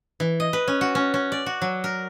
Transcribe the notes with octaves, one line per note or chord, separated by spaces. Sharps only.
E3
D#5
B4
C#4
F#4
C#4
C#4
D5
F#4
F#3
A#4